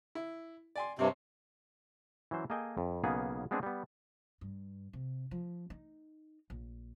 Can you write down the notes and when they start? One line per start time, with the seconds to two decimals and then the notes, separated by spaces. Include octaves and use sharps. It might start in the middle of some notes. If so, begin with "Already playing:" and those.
0.15 E4
0.76 D5 G#5 C6
0.99 G2 C3 C4 C#5
2.31 E3 F#3 C#4 C5
2.50 A#3 G#4 A4 D#5 G5 G#5
2.77 F2
3.04 B1 C#3 A#3 B3 G#4
3.51 G#3 B3 C4 D4 G#4
3.63 G3 B3
4.41 G2
4.93 C3
5.31 F3
5.70 D#4
6.50 A#1